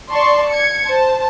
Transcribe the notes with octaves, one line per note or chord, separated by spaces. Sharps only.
D5 A5 C6 C#6
G#6 C#7
C5 A5